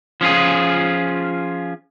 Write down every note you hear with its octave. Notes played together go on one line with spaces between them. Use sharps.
F3 C#4 F4 G#4